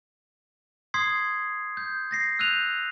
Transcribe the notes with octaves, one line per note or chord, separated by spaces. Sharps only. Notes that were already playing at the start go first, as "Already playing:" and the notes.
C6 D#6 G#6 B6 C7
G6
A6 A#6 C7
E6 F#6 G6 D#7 F7